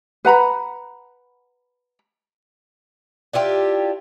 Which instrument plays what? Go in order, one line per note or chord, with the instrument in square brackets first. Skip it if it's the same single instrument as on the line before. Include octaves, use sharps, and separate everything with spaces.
[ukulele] B4 F#5 A#5 B5
[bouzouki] D4 E4 F4 G4